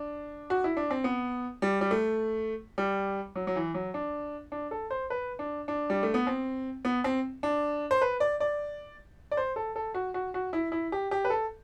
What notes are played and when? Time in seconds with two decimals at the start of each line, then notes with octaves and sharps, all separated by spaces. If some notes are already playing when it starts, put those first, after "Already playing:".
Already playing: D4
0.50 F#4
0.64 E4
0.77 D4
0.91 C4
1.04 B3
1.62 G3
1.81 G3
1.91 A3
2.78 G3
3.36 F#3
3.47 F#3
3.56 E3
3.74 F#3
3.94 D4
4.52 D4
4.71 A4
4.91 C5
5.10 B4
5.39 D4
5.68 D4
5.90 G3
6.03 A3
6.14 B3
6.27 C4
6.85 B3
7.04 C4
7.43 D4
7.91 C5
8.02 B4
8.20 D5
8.40 D5
9.31 D5
9.37 C5
9.56 A4
9.76 A4
9.94 F#4
10.14 F#4
10.34 F#4
10.53 E4
10.72 E4
10.92 G4
11.11 G4
11.25 B4
11.30 A4